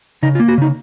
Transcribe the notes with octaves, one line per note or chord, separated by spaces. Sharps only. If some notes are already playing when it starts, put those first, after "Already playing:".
C#3 D#4
F4
A#3
F#4
C#3 D#4